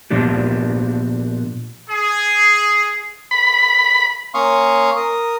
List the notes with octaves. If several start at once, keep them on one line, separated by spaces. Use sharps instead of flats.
A#2 F3 B3 D4 G4
G#4
B5
A#3 C#4 F5 C6 C#6 D#6
A#4 D#6